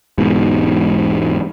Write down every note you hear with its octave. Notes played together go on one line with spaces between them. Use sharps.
E1 G#2 B2